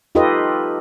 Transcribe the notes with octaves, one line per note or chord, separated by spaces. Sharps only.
D#4 F4 G4 A4 B4 D#5